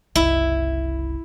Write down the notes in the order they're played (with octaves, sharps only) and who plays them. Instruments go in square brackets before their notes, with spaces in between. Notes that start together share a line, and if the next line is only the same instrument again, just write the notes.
[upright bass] F#1 C2 [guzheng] E4